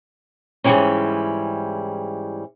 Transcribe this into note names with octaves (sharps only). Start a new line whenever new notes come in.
G#2 E3 F3 G3 A#3 C#4